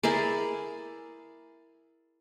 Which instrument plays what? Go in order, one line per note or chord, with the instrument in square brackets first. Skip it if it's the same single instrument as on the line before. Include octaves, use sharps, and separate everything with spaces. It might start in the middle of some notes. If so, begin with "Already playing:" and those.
[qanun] E4 G#4 A#4 D5